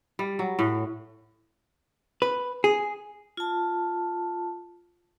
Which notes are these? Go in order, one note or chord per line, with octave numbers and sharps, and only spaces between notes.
G3
F#3
A2
B4
G#4
F4 A5